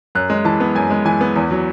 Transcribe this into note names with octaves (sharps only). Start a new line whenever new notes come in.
F#2 F#6
G#3
E3 A5
B3
F#2 G#5
G#3
E3 G#5
B3
E2
F#3